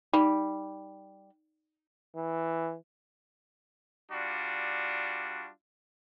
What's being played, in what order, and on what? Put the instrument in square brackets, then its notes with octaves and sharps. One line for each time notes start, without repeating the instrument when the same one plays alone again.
[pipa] G3 [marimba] D#4
[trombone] E3
[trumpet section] G3 D4 F4 F#4